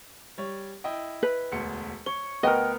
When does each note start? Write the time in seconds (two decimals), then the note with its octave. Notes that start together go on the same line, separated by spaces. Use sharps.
0.38 G3 C#5
0.84 E4 D#5 G5
1.23 B4
1.52 E1 D2 C#7
2.06 C#5 G7
2.43 D2 B3 A#4 D#5 G5